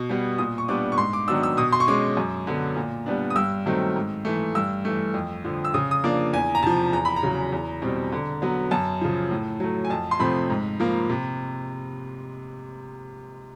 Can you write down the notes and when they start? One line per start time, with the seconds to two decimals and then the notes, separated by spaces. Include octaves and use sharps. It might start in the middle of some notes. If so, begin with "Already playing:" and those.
Already playing: B2
0.09 G3 B3
0.38 A#2 D#6
0.58 C#6
0.68 G3 B3 D4 D6
0.92 C#6
0.98 G#2 C6
1.13 D6
1.28 D#3 F#3 B3 D4 E6
1.43 E6
1.57 B2 D#6
1.72 C6
1.80 C#6
1.88 G#3 C#4 D6
2.17 F#2
2.47 D3 F#3 B3
2.76 A#2
3.06 G3 B3 D4
3.30 D#6
3.36 G2 E6
3.66 D#3 F#3 A3 C4
3.96 G#2
4.25 E3 A3
4.55 G2 E6
4.85 E3 A3
5.14 F2
5.45 D3 F3
5.65 E6
5.74 C#3 D#6
5.91 D#6
6.04 F3 A#3 D4 D6
6.33 E2 G#5
6.55 A#5
6.63 C3 F3 A5
6.93 E2 A#5
7.05 B5
7.16 A#5
7.23 C#3 F#3
7.52 E2
7.82 B2 G3 C4
8.12 D3
8.42 F#3 B3
8.71 F#2 A5
9.01 C#3 F3
9.31 A2
9.60 F#3 A3
9.85 G#5
9.90 F2 A5
10.11 C6
10.19 C3 F3 A3 C4 B5
10.50 G#2
10.80 F3 A#3
11.10 C3